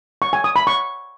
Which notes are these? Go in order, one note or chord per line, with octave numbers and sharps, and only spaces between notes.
C#6
G#5
D#6
B5
C#6